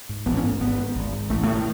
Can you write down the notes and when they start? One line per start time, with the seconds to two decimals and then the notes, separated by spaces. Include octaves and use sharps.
0.09 G#2
0.26 A1 B3
0.37 C#4
0.43 G#2 B3
0.61 G#1 B3
0.78 G#2
0.95 G#1
1.13 G#2
1.30 A1 A3
1.47 A2 A3
1.57 D#3